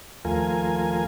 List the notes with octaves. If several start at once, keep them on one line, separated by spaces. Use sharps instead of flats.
D#2 F3 A3 F4 A#4 G#5